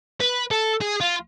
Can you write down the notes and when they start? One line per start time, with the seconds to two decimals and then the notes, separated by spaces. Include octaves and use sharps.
0.20 B4
0.51 A4
0.81 G#4
1.01 F4